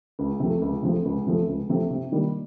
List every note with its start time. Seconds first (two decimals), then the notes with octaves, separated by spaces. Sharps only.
0.19 C#2
0.40 C3 F3 A3
0.62 C#2
0.83 C3 F3 A3
1.05 C#2
1.27 C3 F3 A3
1.48 C#2
1.69 C3 F3 A3
1.90 C3
2.12 D#3 G3 A#3